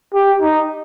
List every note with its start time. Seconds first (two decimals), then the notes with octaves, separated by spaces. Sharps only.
0.14 G4
0.42 D#4